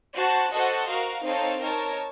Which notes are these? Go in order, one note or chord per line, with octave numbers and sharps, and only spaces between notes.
F#4 C5 F#5 A5
F#4 A4 C5 D#5 F#5
F#4 A#4 F5
C4 D#4 A4 C#5 F5
D#4 A#4 C#5 A5